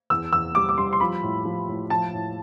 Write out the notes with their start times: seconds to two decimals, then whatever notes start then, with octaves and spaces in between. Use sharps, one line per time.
0.10 E2 E6
0.32 E2 E6
0.55 G3 D6
0.69 D6
0.78 G3 C6
0.93 C6
1.00 F3 B5
1.23 A2
1.45 F3
1.68 A2
1.90 F3 A5
2.13 A2